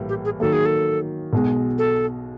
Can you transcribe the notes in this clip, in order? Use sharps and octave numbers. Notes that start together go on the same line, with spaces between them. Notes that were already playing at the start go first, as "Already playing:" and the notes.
Already playing: A#1 A2 E3 G3 A#3
G4
G#4
D#3 F#3 A#3 A4
G#4
A4
B1 B2 G#3
A4